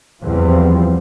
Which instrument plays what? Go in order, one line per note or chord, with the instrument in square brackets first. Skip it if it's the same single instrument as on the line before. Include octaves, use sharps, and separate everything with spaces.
[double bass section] E2 F3 G3 C4